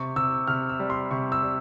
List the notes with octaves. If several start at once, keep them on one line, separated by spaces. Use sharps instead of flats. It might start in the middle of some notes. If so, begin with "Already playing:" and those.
Already playing: C3 C#6
C3 E6
C3 F6
E6
G3
C6
C3 C#6
E6
G3